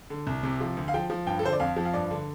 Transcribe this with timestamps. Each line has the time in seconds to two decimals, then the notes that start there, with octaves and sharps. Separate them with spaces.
0.10 D3
0.27 C2
0.43 C3
0.61 F3
0.77 D2
0.88 F5
0.94 F3 G5
1.10 F3
1.26 G2 G5
1.39 A4
1.43 D3 C5
1.53 D5
1.60 F2 F5
1.76 F3
1.85 F5
1.94 G2 D5
2.11 D3